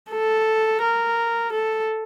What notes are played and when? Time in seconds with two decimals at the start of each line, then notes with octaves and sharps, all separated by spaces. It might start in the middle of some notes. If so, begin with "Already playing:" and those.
0.11 A4
0.81 A#4
1.52 A4